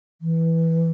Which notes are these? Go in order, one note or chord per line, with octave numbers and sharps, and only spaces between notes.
E3